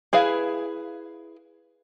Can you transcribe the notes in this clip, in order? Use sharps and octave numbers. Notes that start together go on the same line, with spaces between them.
E4 G#4 B4 F5